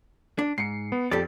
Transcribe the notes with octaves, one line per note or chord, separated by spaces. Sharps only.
D4
G#2 C7 C#7
B3
F2 G4 A4 D5